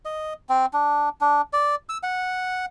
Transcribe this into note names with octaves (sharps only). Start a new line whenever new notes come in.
D#5
C4
D4
D4
D5
E6
F#5